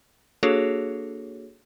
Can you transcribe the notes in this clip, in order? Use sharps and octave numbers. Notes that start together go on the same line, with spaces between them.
A#3 D4 F#4 G#4 A4 C#5